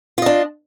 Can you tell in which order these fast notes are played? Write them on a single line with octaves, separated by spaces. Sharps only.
F4 D#5 D4